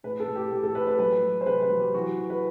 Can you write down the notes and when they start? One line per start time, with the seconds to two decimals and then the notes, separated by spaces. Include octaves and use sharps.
0.03 A2 B4
0.20 A4
0.27 A2
0.36 G4
0.51 A2 G4
0.63 A4
0.75 A2 B4
0.87 B4
0.99 F#3 B4
1.23 F#3
1.41 C5
1.46 C3 B4
1.62 B4
1.70 F#3
1.79 G4
1.94 E3 F#4
2.18 E3
2.30 B4